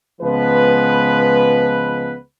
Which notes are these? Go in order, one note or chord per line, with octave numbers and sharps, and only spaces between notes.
C#2 F3 G#3 B3 B4